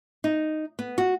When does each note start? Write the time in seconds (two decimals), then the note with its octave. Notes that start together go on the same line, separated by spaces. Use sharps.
0.24 D#4
0.79 B3
0.98 F#4